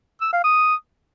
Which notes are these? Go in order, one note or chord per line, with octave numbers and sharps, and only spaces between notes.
E6
F5
D#6